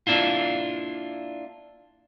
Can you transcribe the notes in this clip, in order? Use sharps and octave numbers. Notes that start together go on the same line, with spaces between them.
A#3 D4 E4 F4